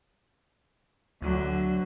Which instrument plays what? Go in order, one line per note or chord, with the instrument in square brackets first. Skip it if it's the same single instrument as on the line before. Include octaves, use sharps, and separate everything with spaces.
[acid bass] D2 [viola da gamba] D3 F#3